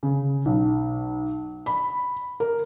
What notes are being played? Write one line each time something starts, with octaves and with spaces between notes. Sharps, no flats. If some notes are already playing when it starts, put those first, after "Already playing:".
C#3
B1
B5
A#4